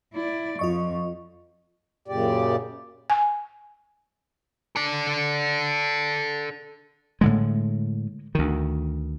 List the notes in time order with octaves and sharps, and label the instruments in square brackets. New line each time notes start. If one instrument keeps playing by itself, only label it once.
[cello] E4 D5
[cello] F2 [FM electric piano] F4 D#5 C#6
[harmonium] F#2 A#2 C#3 G4 D5
[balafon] G#5
[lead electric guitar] A4 D5
[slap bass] A2 D3 G#3
D2 D#3